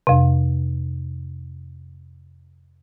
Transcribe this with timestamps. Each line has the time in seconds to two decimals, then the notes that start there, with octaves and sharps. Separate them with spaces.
0.07 F2 C3